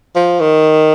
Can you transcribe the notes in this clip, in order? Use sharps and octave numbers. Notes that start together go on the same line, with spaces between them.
F3
D#3